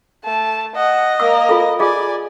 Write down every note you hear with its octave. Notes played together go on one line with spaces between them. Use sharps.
A3 A5
D#5 F#5
A#3 A#4 E6
F4 A4
F4 G#4 D5 D#5 G#5